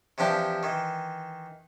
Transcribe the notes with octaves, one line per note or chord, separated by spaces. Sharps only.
C3 E3 F3 D4 G4
D#3 E3